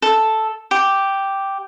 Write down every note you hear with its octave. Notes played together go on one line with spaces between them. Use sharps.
A4
G4